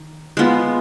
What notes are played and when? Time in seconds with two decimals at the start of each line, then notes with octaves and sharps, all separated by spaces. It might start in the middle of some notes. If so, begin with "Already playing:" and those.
Already playing: D#3
0.37 G#3 B3 F4